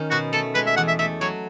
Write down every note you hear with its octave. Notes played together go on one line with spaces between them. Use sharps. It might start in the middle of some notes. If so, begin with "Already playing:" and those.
Already playing: D#3 C#4
B2 F#4
A3 A4
G#3 B4
E5
E2 F#5
E5
A3 E5
F#3 C#5